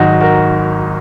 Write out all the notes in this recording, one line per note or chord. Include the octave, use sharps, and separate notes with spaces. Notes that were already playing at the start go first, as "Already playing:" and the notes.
Already playing: G#1 G#2 D#3 F#3 D#4 F#4
F#4 A#4